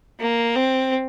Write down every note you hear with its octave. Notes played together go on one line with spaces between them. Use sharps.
A#3
C4